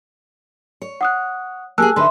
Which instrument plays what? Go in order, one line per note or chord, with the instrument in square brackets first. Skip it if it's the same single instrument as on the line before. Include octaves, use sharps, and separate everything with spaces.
[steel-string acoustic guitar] C#5
[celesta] F#5 D#6 F#6
[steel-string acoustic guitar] A#3 G4 G#4 [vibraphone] G#5 [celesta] A5 E6 F#6
[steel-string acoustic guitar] D3 D#4 B4 [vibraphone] E5 C6